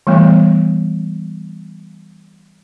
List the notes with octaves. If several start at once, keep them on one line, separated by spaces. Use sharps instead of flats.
E3 G3 A3 B3